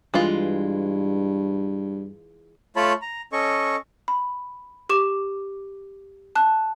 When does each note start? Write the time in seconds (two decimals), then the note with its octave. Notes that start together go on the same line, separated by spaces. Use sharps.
0.14 G2 E3 G#3 F4
2.76 A3 F4 C#5 A5 B5
3.02 A#5
3.33 C#4 A4 D#5 C#6
4.08 B5
4.89 G4 C#6 D6 E7
6.35 A5 F#6